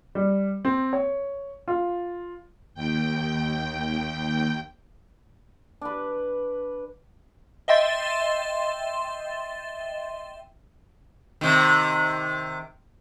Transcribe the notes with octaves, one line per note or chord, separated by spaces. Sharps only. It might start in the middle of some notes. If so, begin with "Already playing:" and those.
G3
C4
C#5
F4
D#2 G5
D4 B4
D#5 E5 G5 C6 A6
C3 D#3